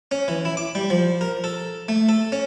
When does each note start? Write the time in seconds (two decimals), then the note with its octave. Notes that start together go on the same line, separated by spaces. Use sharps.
0.11 C#4
0.28 E3
0.45 E4
0.57 D6
0.75 G3
0.90 F3
1.21 A#4
1.44 A4
1.89 A3
2.09 A4
2.32 C#4